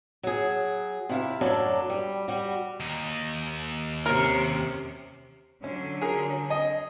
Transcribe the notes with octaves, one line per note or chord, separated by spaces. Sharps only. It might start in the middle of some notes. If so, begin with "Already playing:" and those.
F#3 G#4
C3 E4 F5
F#2 A2 F#3 D4 A4
G3
G3 F#4
D#2 D#4
C3 C#4 A#4
D3 F#3 C#4
G#4 A#4
D#5